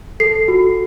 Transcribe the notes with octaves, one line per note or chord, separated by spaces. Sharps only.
A4 C7
F#4